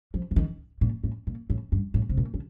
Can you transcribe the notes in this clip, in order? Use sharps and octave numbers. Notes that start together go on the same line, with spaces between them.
F3
F3
D#3
A#2
A2
A#2
A2
G2
A2
C3
A#2
D3